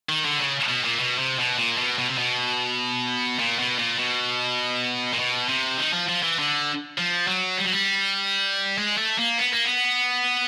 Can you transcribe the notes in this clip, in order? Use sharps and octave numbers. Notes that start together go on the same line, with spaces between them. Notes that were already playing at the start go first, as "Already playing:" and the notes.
D#3
D3
C#3
B2
A#2
B2
C3
B2
A#2
B2
B2
C3
B2
A#2
B2
A#2
B2
A#2
B2
C3
D#3
F3
F3
E3
D3
F3
F#3
G3
F#3
G3
G#3
A3
A#3
B3
A#3
B3